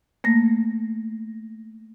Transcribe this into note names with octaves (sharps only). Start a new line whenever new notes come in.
A3 A#3 A#6